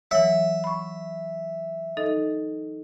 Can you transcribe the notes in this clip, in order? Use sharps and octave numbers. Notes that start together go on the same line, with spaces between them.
E3 F#3 C#5 E5
B5 C#6
D#4 A4 D#5